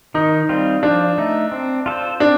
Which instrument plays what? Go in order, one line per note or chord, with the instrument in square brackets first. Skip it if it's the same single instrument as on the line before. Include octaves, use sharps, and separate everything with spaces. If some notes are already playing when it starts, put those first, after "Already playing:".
[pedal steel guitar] D#3 [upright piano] D#4
[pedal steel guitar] G3 C4 F4
[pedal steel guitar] F3 [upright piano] D4
[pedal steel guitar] A3 D#4
C4
F4 A4 C5
[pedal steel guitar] C4 [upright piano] D4